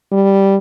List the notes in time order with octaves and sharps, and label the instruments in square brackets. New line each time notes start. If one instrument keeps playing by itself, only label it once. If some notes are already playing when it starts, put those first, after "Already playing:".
[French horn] G3